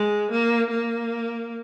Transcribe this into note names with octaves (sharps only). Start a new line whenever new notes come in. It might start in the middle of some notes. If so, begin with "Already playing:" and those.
Already playing: G#3
A#3
A#3